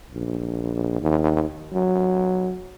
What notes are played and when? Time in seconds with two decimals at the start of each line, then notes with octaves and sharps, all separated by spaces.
0.14 A#1
1.01 D#2
1.73 F#3